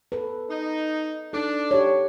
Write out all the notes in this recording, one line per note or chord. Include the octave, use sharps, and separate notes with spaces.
A4 B4
D#4
D4 D#4 A4
G4 C#5